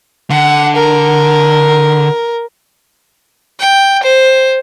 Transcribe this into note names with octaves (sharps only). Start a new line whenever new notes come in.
D3 F#5
A#4
G5
C5